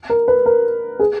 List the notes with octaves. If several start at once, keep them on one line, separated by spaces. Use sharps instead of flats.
A#4
B4
A#4
G#4